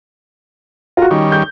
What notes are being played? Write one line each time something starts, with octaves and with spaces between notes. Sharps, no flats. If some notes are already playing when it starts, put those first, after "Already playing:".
F4 F#4 A#4
D#3 G3 C#4 D#4
G6